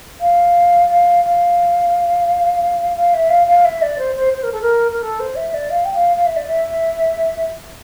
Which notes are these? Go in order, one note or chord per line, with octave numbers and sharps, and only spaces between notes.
F5
F5
F5
F5
E5
F5
F5
E5
D5
C5
C5
C5
A#4
A4
A#4
A#4
A4
C5
E5
D5
F5
G5
F5
F5
E5
D5
E5